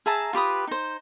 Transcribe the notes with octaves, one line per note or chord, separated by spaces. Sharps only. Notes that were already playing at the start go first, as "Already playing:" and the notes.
G#4 E5 A5 A#5
F4 G4 B4 D#6
D#4 C5